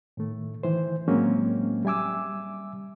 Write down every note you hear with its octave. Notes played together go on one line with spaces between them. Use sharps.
A2 D#3 A3
D#3 E3 C5
A2 F#3 G#3 A#3 C4 C#4
G3 E5 G#5 D6 E6